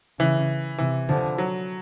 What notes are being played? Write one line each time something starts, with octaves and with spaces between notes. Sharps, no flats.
C#3 E3
C3 E3
D3 F3
F#3